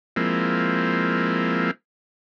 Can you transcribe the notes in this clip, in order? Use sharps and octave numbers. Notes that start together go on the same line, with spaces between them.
F3 G#3 A#3 C4 E4